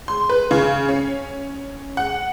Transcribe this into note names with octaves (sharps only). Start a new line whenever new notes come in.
C6
B4
C#3
C#4
F#5